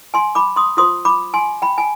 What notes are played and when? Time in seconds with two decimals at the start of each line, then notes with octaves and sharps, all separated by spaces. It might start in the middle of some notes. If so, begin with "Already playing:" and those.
0.14 G#5 C6
0.35 B5 D6
0.56 C6 D#6
0.77 F4 C5 C6 D#6
1.05 B5 D6
1.34 G#5 C6
1.62 G5 B5
1.78 G#5